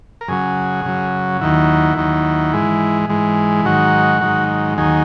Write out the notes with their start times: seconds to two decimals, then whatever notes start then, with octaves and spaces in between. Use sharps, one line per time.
0.21 A#4
0.28 F#2 C#3 F#3 G#4
0.84 F#2 C#3 F#3
1.41 D#2 D#3 F#3 E4
1.97 D#2 D#3 F#3
2.53 G#2 E3 G#3
3.09 G#2 E3 G#3
3.65 G#2 D#3 F#3 F#4
4.21 G#2 D#3 F#3
4.78 D#2 D#3 F#3 G#4